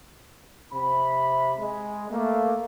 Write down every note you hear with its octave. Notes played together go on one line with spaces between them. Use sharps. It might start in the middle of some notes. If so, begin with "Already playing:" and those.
C3 B5
G#3
A3 A#3